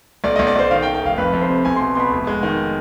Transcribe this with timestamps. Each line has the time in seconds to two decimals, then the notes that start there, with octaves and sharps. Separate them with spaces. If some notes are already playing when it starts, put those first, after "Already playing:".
0.24 B1 D5
0.36 B1 D#5
0.47 D5
0.55 B1 C5
0.71 D#3 F5
0.82 G5
0.86 D#3
0.94 G5
1.02 F1 F5
1.18 F2 B4
1.33 F2
1.41 C5
1.49 C3
1.65 B1 G#5
1.76 B2 C6
1.95 B2 B5 C6
2.11 F1
2.27 G#3
2.43 D#3